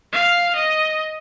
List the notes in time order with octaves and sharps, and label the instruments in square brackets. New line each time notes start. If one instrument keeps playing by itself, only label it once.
[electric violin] F5
D#5